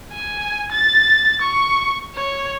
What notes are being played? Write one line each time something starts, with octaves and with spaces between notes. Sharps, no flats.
G#5
A6
C#6
C#5